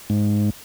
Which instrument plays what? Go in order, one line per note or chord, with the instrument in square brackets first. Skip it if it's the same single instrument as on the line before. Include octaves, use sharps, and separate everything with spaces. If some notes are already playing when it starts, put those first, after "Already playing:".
[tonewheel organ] G#2